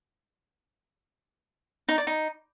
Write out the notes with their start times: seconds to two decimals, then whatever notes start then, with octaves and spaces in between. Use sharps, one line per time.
1.89 D#4
1.98 D5
2.07 D#4